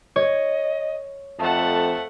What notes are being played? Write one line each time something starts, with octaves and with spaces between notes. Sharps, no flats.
C#5 D#5
F2 A3 F#5 A5